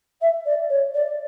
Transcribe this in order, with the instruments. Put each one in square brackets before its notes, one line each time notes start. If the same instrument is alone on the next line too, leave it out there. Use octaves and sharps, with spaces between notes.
[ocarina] E5
D5
C#5
D5